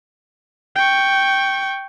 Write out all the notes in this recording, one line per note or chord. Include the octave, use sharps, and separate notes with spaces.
G5 C#6